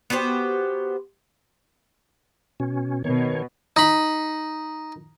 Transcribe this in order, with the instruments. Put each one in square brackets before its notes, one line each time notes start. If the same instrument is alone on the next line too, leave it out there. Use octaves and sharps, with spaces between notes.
[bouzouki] B3 F#4 G4 C5
[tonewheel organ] B2 C#4
[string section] B2 [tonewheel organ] D#3 C#5
[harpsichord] D#4 B5